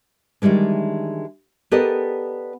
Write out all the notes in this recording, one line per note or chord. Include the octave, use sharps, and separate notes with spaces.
D#3 E3 G3 G#3 D4
B3 G4 A4 A#4 D5 D#5